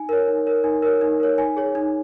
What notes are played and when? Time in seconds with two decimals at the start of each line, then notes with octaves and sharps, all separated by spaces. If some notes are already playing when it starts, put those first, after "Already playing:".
Already playing: D#4 G#5
0.09 A#4 C#5
0.28 D#4
0.46 A#4 C#5
0.64 D#4 G#5
0.82 A#4 C#5
1.01 D#4
1.20 A#4 C#5
1.38 D#4 G#5
1.57 G#4 C#5
1.75 D#4